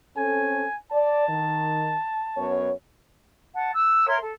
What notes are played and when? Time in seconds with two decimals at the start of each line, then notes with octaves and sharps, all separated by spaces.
0.17 C4 C#4 A4 G#5
0.92 D5 A5
1.29 D#3
2.37 F#2 B3 C#5
3.53 F#5 A5
3.72 E6 F#6
4.06 A#4 C#5 E5 C6
4.20 A4